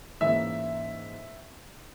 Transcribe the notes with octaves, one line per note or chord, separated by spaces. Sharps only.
G#2 E3 A#3 C#4 E5